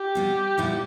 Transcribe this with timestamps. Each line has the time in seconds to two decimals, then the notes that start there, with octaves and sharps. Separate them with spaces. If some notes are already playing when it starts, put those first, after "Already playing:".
Already playing: G4
0.15 B2 G3 B3
0.58 A#2 G3 B3 E4